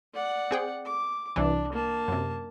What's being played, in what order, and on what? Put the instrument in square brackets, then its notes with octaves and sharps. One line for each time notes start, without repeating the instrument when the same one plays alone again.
[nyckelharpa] D5 F#5
[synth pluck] C4 G#4 G5
[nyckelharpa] D6
[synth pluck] C2 E3 [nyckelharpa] D4
[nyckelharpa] A#3 A5
[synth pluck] F#2 C3